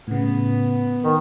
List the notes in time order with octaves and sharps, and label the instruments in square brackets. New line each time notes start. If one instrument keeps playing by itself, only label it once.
[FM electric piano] A2 C#3 [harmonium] B3
[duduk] D#3